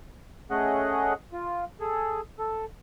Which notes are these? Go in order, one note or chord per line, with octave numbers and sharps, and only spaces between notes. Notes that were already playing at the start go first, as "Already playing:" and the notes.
A3 C#4 G#4 D#5 F#5
F4
G#4 A4
A4